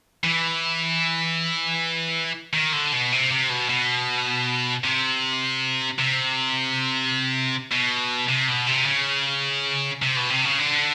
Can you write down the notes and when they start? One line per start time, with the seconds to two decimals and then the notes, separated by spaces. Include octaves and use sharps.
0.24 E3
2.54 D#3
2.73 D3
2.93 B2
3.12 C3
3.31 C3
3.49 B2
3.69 B2
4.84 C3
5.99 C3
7.72 B2
8.29 C3
8.48 B2
8.67 C3
8.86 C#3
10.02 C3
10.17 B2
10.30 C3
10.45 C#3
10.59 D3